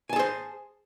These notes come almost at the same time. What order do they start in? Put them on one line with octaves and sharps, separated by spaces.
G#5 A5 G#4 C5